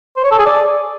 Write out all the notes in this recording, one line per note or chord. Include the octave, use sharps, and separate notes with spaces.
C5
C#5
A4
G#4
D5